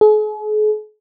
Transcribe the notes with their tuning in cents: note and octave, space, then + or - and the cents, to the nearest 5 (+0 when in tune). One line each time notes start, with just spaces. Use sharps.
G#4 +45